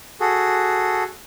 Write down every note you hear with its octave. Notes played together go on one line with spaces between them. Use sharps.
F#4 G#4 A4